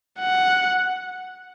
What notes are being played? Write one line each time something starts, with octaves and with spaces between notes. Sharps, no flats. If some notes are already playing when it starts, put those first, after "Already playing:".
F#5